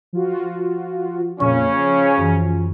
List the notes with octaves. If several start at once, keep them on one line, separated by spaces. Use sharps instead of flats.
F3 F4 F#4
F2 A#2 C#3 C#4 C#6
F3
F#2 E3